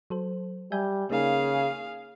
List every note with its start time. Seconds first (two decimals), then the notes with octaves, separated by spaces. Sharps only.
0.10 F#3 A4 C5
0.72 G3 E5 G#5 G6
1.10 C#3 A#3 D#4 G#4 A#4 F5